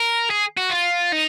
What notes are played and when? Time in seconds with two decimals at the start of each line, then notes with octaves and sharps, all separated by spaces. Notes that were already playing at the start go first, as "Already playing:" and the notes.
Already playing: A#4
0.30 G#4
0.57 F#4
0.71 F4
1.13 D#4